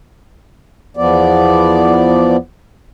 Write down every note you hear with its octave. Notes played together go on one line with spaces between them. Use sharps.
E2 F3 B3 D5